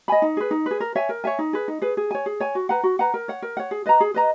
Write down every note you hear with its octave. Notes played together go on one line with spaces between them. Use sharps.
D#5 G#5 B5
D#4
G#4 B4
D#4
G#4 B4
A#4
C#5 E5 G#5
A#4
C#5 E5 G#5
D#4
G#4 B4
D#4
G#4 B4
G#4
C#5 G#5
G#4
C#5 G#5
F#4
B4 F#5 A#5
F#4
B4 F#5 A#5
A#4
C#5 F#5
A#4
C#5 F#5
G#4
B4 D#5 A#5
G#4
B4 D#5 A#5